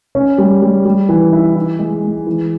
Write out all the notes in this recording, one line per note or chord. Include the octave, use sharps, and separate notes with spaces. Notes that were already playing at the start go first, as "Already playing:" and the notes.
C#4
G3
G3
G3
E3
E4
E4
G#3
G#3
E3